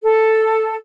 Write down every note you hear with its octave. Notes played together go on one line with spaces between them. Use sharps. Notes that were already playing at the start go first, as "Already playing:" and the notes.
A4